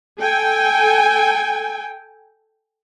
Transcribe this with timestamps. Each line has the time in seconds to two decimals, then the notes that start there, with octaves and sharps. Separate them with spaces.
0.19 A4 G5 G#5